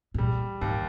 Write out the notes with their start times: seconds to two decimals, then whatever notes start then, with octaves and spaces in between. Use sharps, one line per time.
0.14 G#2
0.18 A#2 G3
0.61 D#2 G#2